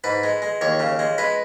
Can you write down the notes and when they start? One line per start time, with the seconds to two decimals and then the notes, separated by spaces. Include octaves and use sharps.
0.04 G#2 B4
0.23 G#3
0.42 G#3
0.61 D#2 C#5
0.79 C#3
0.99 G#3
1.18 G#3 B4